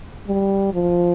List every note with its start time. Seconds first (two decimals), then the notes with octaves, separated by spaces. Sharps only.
0.27 G3
0.73 F3